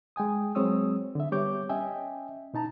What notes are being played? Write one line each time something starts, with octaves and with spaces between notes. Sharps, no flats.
G#3 G5 G#5 D#6
F#3 G#3 C4 C#5 D#6 E6
D3 E5
G3 B3 G4 C#5 D6 G6
C#4 D#5 E5 G5 G#5
B2 D#4 A5 A#5